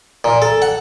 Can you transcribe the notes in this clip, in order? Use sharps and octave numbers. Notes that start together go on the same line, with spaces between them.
A#2
A4
F#5